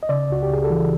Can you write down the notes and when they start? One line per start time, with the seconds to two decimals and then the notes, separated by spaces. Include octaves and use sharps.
0.03 D#5
0.09 C#3 D5
0.30 C#2 F#4
0.43 G4
0.50 C#2 G#4
0.64 A4
0.70 E3